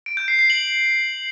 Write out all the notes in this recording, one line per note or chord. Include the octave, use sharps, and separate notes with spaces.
D7
G6
C7
C7
F#7